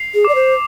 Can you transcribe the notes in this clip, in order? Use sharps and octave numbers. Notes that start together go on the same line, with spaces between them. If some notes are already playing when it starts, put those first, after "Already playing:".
Already playing: C7 F7
G#4
D5 D6
C5